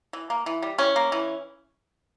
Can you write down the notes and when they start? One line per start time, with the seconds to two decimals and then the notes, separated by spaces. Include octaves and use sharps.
0.13 E3
0.30 A#3
0.46 E3
0.62 G3
0.78 E3 C#4
0.96 A#3
1.12 E3